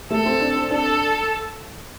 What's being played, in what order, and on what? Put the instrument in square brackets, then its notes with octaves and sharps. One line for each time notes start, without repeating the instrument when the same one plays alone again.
[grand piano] A3 [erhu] A4
[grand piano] C4
D4
C4
[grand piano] D4 [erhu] A4